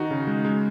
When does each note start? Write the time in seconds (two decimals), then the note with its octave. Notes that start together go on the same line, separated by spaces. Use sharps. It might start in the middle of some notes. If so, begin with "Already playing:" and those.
Already playing: D#3 D#4 F#4
0.11 C#3
0.27 G#3
0.45 G#3